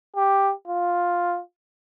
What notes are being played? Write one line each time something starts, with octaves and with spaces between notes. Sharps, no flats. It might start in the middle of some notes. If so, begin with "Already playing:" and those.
G4
F4